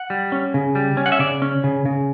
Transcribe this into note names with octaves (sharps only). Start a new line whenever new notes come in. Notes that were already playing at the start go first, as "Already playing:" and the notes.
Already playing: F#5
G3
C#4
C#3
G3
C#4
F#5
E5
C#3 D5
C#4
C#3
C#3